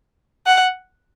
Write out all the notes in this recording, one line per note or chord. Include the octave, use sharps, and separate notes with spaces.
F#5